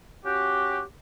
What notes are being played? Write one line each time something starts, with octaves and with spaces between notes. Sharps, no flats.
C#4 F#4 G4